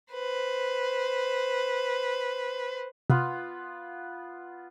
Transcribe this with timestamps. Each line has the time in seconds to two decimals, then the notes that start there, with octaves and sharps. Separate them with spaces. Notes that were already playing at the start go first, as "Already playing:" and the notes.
0.13 B4 C5
3.10 C3 B3 F4